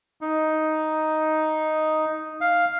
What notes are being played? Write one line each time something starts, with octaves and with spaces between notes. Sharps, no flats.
D#4
F5